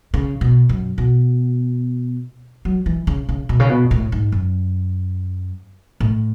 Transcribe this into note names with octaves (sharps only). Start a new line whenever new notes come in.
C#3
B2
F#2
B2
F#3
E3
C#3
C#3
B2
C#3
B2
A2
G#2
F#2
A2